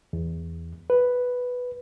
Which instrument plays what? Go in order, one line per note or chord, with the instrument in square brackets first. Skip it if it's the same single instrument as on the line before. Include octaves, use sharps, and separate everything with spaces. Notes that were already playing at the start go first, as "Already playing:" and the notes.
[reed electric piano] E2
B4